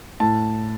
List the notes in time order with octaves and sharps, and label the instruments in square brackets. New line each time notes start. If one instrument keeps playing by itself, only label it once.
[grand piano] A2 A5